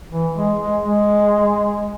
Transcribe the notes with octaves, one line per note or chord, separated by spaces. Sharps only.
E3
G#3
G#3
G#3